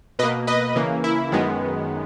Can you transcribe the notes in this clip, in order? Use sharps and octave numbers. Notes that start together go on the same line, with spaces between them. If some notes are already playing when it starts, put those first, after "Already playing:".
B2 A#3 B4 D#5
B4 D#5
C#3 E3 A#3
E4
F#2 D#3 G#3 B3